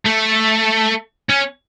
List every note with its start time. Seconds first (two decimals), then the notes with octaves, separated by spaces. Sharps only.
0.05 A3
1.29 C#4